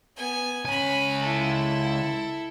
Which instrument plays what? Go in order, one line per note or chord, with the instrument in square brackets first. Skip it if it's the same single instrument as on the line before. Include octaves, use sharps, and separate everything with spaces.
[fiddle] B3 G#5
[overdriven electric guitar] C#2 G#5 [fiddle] C#4 B5
[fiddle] E4 A4